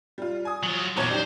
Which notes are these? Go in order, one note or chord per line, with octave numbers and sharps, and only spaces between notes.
G3 F4
G#5 D#6
F#3 F4
B1 E2 A#2 C#5
D4 D#4 G4 C5